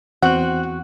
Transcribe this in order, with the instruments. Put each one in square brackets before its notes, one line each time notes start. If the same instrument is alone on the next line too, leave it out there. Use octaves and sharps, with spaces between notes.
[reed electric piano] E2 F#6 [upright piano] C4 [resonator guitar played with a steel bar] F#4 [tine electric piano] F#5